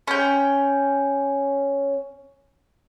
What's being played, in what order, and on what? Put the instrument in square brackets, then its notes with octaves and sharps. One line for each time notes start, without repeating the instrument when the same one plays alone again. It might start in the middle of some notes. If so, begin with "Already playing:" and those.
[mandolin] C#4 G5